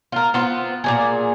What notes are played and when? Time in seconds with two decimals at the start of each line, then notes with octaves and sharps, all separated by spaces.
0.12 F4 A#4
0.34 B3 C4 F4
0.84 A#2 C#3 G#4